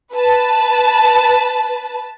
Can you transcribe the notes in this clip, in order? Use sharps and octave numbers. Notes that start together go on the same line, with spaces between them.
B4 A5